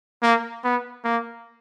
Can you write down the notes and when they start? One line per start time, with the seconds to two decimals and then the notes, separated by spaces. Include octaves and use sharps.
0.23 A#3
0.64 B3
1.04 A#3